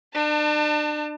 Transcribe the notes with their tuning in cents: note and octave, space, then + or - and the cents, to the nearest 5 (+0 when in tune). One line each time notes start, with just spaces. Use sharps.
D4 +40 A5 +25